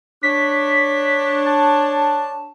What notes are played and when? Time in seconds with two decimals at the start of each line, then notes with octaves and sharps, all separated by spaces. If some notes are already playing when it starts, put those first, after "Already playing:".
0.23 D4 C#5 B6
1.46 A5